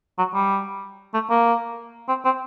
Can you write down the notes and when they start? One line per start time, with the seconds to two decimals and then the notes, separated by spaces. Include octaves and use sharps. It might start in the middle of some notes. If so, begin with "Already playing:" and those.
0.19 F#3
0.34 G3
1.14 A3
1.30 A#3
2.09 C4
2.25 C4